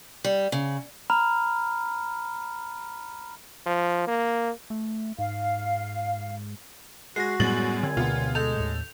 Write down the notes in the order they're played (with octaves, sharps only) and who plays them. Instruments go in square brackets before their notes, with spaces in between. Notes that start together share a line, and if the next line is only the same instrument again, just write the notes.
[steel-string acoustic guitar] G3
C#3
[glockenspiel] A#5 B5 F6
[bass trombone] F3
A#3
[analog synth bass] A3
[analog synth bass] G#2 [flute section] F5
[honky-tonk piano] G#3 [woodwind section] F#4 [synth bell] A#6 C7
[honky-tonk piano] F#2 G#3 F#7 [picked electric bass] A2 G3 B3 [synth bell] A6
[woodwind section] A#2 G#3 G#5 [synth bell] D3
[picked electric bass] D2 B2 [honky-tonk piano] B3 F4
[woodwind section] G#3 [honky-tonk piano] A4 [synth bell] G6 F7
[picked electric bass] D#2 A2